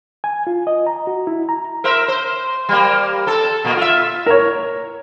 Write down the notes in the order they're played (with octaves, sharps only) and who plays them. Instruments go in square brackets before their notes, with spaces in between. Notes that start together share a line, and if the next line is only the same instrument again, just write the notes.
[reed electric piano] G#5
F4
D#5
A#5
F#4
E4
A#5
[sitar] A#4 C5 E5
C5
G3 A#3
C4 A4
A#2 A#3
F4 E5
[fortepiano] A#4 C#5